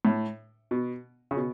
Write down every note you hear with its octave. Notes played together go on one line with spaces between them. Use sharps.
A2
B2
C#3
B2